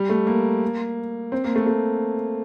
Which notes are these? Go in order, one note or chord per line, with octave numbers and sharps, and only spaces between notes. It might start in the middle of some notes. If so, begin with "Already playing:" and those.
Already playing: G3
A3
A#3
C4
A#3
A3
A3